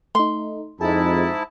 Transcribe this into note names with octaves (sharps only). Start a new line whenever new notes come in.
A3 D#4 C6
F2 G#2 D#4 E4 G#4 A5